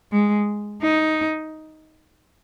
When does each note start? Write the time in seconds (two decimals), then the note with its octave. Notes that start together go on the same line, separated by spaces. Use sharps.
0.12 G#3
0.82 D#4